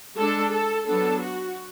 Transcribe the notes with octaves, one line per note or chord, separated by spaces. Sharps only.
G#3 D4 A4
A4
F#3 B3 D4 A4
F#4